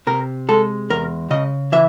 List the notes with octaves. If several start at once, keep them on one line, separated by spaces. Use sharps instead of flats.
C3 A#4
G#3 A4
E2 A#4
C#3 D#5
E3 E5